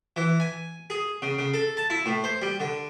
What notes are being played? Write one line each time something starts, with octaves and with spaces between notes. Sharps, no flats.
E3
G#5
G#4
C#3
C#3
A4
A5
E4
A2
C5
G3
D3